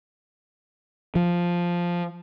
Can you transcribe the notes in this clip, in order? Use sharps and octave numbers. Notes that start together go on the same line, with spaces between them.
F3